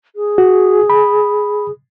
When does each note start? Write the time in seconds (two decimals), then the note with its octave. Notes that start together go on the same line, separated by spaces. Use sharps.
0.15 G#4
0.38 F#4
0.90 B5